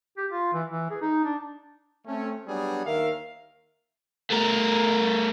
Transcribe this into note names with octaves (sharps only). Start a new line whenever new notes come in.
G4
F4
E3
E3
G#4
D#4
D4
A3 C4 C#4
F#3 G3 B3 D4 F#4 G#4
D#2 D#3 A#4 E5 F5
A3 A#4